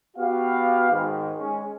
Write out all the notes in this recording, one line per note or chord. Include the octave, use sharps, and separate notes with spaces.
B3 F#4 G4 F5
G#2 D#3
G#3 C#4